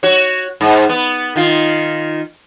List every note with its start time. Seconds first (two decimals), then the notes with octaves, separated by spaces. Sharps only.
0.03 F#4 C#5
0.61 G#2
0.89 B3
1.36 D#3 F4